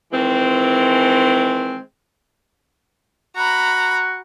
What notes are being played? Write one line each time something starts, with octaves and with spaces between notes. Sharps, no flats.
D#3 E3 G#3 C4
F#4 A#5 B5